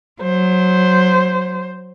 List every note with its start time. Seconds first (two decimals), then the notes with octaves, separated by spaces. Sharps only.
0.22 F#3 C5